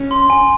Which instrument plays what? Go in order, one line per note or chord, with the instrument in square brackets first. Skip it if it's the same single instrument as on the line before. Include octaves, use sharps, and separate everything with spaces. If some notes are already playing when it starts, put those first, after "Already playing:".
Already playing: [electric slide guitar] C#4
[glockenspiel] C6
G#5